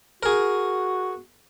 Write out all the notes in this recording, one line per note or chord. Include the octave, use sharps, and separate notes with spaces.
F#4 G#4 A#4